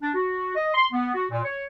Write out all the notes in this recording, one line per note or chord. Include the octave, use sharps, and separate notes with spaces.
D4
F#4
D#5
C6
B3
F#4
A#2
C#5